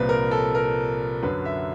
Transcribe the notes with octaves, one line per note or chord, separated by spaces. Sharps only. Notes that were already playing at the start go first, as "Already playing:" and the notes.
Already playing: C2 A#2 F3 B4
A#4
A4
A#4
F#2 D3 F#3 B4
E5